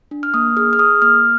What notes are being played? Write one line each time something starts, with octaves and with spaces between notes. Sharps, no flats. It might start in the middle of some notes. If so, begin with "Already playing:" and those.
D4
F6
A#3 D#6
G#4 F6
F6
G#4 D#6
A#3 F6